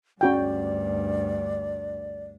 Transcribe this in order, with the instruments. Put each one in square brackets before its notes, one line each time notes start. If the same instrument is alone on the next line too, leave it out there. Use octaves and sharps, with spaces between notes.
[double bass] D2 G2 [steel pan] C#4 F#4 G5 [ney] D5